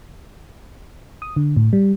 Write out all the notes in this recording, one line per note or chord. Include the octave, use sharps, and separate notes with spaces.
D#6
D3
A2
G3